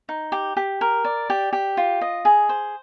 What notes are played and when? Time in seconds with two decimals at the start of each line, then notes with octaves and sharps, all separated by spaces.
0.09 D#4
0.32 G4
0.57 G4
0.81 A#4
1.05 D5
1.30 G4
1.53 G4
1.77 F4
2.01 D#5
2.25 G#4
2.49 C5